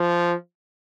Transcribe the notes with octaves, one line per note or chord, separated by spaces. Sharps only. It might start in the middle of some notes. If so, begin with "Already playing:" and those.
Already playing: F3